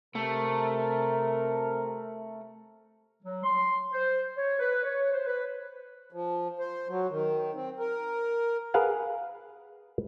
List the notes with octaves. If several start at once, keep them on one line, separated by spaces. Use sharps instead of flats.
C3 A3 A#4
F#3
C6
C5
C#5
B4
C#5
C5
B4
F3
C5
F#3
D#3
C4
A#4
G#4 A#4 B4 F5 F#5